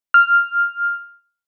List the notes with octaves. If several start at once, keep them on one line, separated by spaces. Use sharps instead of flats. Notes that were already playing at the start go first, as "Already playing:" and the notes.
F6